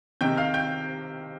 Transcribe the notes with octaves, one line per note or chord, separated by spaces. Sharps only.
C3 D#3 G5 G6
F5 F6
G5 G6